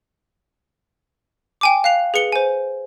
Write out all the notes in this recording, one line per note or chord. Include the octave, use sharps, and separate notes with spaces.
G5 G#5 D6
F5 F#6 C7 F7
G#4 B4 C#7 G7
C5 G#5